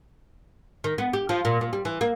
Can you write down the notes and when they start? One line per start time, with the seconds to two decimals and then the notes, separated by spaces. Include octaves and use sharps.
0.84 D#3
0.98 B3
1.13 G4
1.29 F3
1.45 A#2
1.61 A#2
1.73 G3
1.85 E3
2.01 A#3